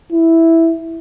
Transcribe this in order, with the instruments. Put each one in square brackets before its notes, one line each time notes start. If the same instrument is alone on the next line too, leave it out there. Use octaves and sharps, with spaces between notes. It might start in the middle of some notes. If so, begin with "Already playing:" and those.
[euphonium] E4